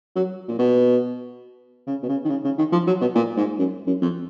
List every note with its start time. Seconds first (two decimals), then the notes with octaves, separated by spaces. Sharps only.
0.15 F#3
0.48 A#2
0.59 B2
1.87 C#3
2.03 B2
2.09 C#3
2.25 D#3
2.30 C#3
2.44 C#3
2.58 D#3
2.72 F3
2.87 F#3
3.01 B2
3.15 A#2
3.37 G#2
3.59 F#2
3.87 F#2
4.02 F2